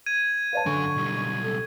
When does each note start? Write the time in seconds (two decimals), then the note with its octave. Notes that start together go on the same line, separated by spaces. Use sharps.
0.06 G#6 D#7
0.53 B4 C#5 F5 A5
0.66 F#2 D3 G#5 C#6
0.96 B1 G3
1.44 A4